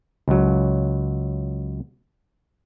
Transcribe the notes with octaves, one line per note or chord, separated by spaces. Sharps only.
C#2 F#3